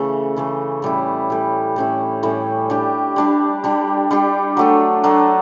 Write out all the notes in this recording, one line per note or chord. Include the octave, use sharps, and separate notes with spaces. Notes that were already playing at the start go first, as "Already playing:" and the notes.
Already playing: C#3 E3 A3
C#3 E3 A3
A2 G3 C#4 E4
A2 G3 C#4 E4
A2 G3 C#4 E4
A2 G3 C#4 E4
G3 D4 G4
G3 D4 G4
G3 D4 G4
G3 D4 G4
F#3 A3 D4
F#3 A3 D4